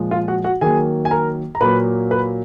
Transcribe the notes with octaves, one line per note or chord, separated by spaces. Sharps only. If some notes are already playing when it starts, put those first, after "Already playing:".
Already playing: A#2 F3 G#3
F4 F5
F#4 F#5
F#4 F#5
D#3 F#3 A#3 G#4 G#5
G#5
A#4 A#5
A#5
A#2 F#3 A#3 B4 B5
B4 B5